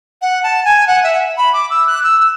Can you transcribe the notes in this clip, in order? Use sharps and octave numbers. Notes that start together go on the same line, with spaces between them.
F#5
A5
G#5
F#5
E5
B5
D6
E6
F#6
E6
E6